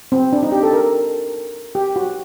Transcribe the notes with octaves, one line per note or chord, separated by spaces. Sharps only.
C4
D4
D#4
G4
A4
A#4
G4
F#4